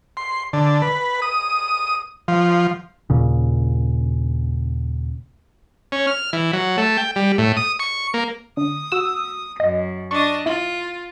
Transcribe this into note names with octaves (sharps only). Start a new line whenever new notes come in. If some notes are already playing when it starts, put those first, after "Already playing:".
C6
D3
B4
D#6
F3
D#2 A#2 C#3
C#4
F6
E3
F#3
A3
G5
G3
A2
D#6
C#6
A#3
D3 D#6
F#4 E6
F#2 D#5
D4 D#5 C#6
E4 F4